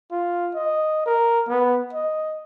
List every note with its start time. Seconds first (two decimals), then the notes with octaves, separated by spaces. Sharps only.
0.11 F4
0.54 D#5
1.06 A#4
1.48 B3
1.93 D#5